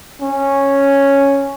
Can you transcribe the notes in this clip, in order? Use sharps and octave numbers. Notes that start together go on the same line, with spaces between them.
C#4